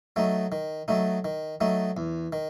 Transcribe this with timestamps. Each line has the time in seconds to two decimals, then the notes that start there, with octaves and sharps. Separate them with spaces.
0.16 F#3 A3 D#4
0.52 D#3
0.88 F#3 A3 D#4
1.25 D#3
1.61 F#3 A3 D#4
1.97 E2
2.33 D#3